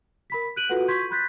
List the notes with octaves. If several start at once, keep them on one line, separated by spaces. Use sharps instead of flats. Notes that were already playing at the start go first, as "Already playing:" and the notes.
A#4 B5 B6
F#6 G6 D7 D#7 F#7
F4 F#4 A4 B4 F#5
C6 C#6 G6 G#6 B6
B5 C6 F#6 G6 A6 B6